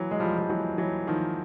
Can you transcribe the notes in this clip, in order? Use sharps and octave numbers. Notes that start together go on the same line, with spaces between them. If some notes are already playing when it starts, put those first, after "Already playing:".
Already playing: E3 F#3
G#3
F3 G3
F3
E3 F#3
E3 F#3
D#3 F3